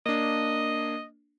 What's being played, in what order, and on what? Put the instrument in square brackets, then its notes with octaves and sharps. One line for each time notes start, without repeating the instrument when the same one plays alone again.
[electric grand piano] A#3 D4 [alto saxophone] D#5